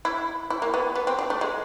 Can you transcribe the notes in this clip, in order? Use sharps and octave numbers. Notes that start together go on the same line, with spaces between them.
E4
E4
A#3
B3
B3
C4
D4
A3
G#3